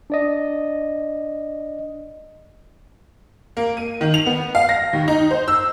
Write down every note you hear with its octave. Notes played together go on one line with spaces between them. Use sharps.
D4 D5 D#5
A#3
D#7
D#3
F7
B3
F5
A#6
D#2
D#4
C5
E6